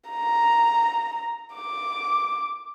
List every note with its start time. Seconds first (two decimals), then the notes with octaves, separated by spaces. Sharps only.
0.10 A#5
1.55 D6